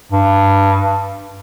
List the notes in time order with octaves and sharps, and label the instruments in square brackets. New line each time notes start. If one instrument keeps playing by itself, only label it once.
[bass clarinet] G2